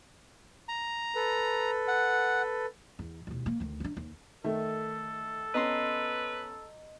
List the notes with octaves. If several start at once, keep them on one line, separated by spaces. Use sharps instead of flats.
A#5
A4 B4
F#5
E2
E1 D#2
A#3
D2 D#3
C#4 D4
D#2
D#3 A3 A4
B3 C#4 B4 D#5 A#5 C6